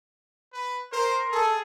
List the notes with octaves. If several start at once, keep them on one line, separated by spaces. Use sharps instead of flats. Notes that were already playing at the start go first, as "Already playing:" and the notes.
B4
A#4 C5 C6
G#4 A4